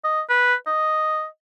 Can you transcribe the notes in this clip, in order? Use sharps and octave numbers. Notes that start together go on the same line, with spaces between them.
D#5
B4
D#5